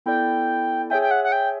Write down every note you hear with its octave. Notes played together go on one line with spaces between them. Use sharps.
B3 E4 A4 D5 G5
G#4 C#5 E5 G5 G#5
G5
F#5
F#5
G5